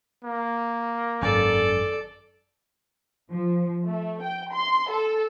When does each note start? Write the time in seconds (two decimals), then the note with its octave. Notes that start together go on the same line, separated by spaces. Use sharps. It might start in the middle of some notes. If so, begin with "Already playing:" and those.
0.24 A#3
1.22 G#1 F#2 A4 D5 G#5
3.30 F3
3.87 A3
4.22 G5
4.51 C6
4.90 A4